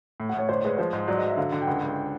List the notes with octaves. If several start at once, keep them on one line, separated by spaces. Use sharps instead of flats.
A2
F#5
A2 C#5
G1 C5
G#3 B4
F3 C5
G#2
F#3 D5
D#5
F#3 E5
D3 F5
D3
G5
C#2 F#5
C#2